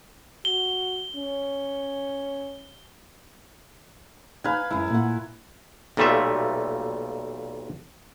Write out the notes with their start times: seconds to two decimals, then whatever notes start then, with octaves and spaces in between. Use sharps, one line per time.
0.45 F#4 G7
1.15 C#4
4.44 D#4 B4 F5 G#5
4.71 F#2 G#3 E4
4.90 A#2 F#5
5.97 B1 A#2 G3 A3 F4 E5